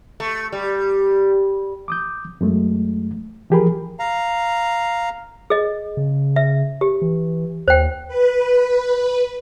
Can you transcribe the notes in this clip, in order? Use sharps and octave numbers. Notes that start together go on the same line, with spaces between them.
A3
G3
D6 D#6 G6
F#2 F#3 G#3 A3
E3 F3 G4 G#4 A#4 B5
F5 A#5
G#4 D#5
C#3
E5
G4
E3
D#2 C5 G5
B4